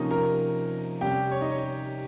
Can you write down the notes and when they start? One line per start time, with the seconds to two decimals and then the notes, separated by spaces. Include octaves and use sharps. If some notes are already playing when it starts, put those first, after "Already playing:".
Already playing: C3 F3 A#3 C#4 D#4 D#5
0.11 A#4 A#5
1.01 C3 G3 C#4 G4 G5
1.31 C#5
1.41 D#4 D#5
1.51 C#5